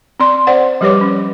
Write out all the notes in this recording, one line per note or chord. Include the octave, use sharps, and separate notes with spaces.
C4 D5 C6
C4 C5 D5 F#5
F3 G3 G4 B4 C#5 D6
C#4